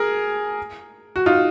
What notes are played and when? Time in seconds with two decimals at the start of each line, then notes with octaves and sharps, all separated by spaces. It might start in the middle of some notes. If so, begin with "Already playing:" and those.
Already playing: G#4 A#4
1.16 F#4
1.26 D#4 F4